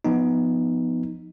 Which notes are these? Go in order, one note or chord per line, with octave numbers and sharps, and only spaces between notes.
F3 B3 D#4